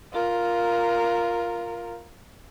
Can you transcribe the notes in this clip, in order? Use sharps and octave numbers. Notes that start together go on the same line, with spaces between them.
F4 A#4